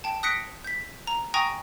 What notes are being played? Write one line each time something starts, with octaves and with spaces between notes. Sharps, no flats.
G5 A5
D#6 F#6 A#6 B6 C#7 D7
G6 B6
A#5
G5 G#5 A#5 C#6 D#6 A#6